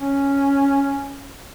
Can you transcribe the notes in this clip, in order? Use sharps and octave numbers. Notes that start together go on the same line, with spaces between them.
C#4